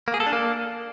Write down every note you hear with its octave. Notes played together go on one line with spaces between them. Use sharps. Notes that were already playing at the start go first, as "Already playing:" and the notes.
A#3
G#4
A4
D4
A#3